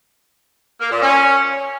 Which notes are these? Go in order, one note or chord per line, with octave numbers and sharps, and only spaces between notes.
A#3
A#2
C#4